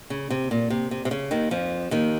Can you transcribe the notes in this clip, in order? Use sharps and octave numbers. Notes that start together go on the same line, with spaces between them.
C#3
C3
A#2
C3
C3
C3
C#3
D#2 D#3
F2 F3
D#2 D#3